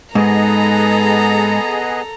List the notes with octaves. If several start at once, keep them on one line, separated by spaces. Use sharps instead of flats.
G#2 B3 G#4 A4 D#5 A#5